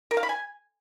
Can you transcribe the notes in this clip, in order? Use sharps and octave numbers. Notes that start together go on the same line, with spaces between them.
A#4
F5
B5
G#5